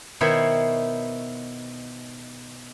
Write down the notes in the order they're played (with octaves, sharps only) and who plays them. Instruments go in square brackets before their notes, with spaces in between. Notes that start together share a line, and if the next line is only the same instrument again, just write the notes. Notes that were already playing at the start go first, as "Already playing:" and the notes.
[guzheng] B2 D#3 E4 C5 C#5 E5